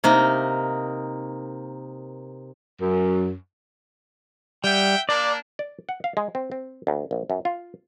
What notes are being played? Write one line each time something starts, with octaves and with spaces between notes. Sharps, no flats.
C3 A#3 D#4
F#2
G3 E5 F#5 G5
A#3 D4 D5
D5
F#5
F5
G#3
C4
C4
D2
A#1
F#2
F4